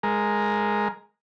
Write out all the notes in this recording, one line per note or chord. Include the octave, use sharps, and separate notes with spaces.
G#3 A#4